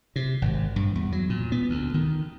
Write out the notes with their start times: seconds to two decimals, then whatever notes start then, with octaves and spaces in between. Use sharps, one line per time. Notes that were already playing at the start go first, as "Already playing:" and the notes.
0.16 C3
0.42 G#1
0.76 G2
0.95 E2
1.12 F#3
1.30 A#2
1.52 B3
1.70 D2
1.94 D#3